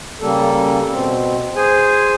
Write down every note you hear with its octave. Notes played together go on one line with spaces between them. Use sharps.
C#3 G3 A#3 A4
B2 C4
G#4 C5 G#5